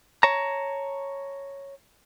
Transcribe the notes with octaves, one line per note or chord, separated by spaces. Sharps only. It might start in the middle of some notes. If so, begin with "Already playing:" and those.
C#5 A5 A#5